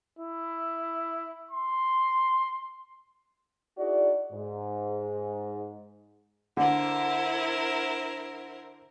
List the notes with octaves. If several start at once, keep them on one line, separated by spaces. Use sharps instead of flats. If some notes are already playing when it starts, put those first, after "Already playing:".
E4
C6
D#4 E4 F#4 G#4 D5
G#2
D3 E4 A#4 C5